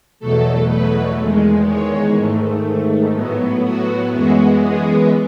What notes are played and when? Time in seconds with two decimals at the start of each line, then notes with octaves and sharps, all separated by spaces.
0.20 E2 B2 F#3 A3 A4
0.68 B4
1.18 E2 D#3 G#3
1.66 C#5
2.16 G#2 D#3 A3
3.15 A2 F#3 B3
3.63 F#4
4.12 F#2 E3 G#3 B3 F#4
4.61 G#4